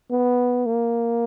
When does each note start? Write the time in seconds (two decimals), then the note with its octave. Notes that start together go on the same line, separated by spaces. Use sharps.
0.11 B3
0.66 A#3